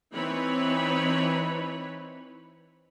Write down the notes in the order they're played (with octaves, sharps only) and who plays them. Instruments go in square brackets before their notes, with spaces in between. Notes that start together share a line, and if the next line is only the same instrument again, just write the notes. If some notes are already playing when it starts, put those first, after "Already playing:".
[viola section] E3 C4 D#4 B4 C#5 B5